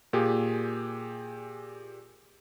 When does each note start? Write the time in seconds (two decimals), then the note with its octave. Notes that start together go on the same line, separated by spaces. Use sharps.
0.13 A#2 G4 G#4